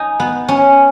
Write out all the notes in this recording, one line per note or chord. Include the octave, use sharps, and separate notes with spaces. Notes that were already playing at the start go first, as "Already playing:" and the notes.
Already playing: D#4 G#5
B3
C#4